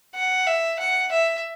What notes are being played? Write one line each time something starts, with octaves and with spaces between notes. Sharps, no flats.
F#5
E5
F#5
E5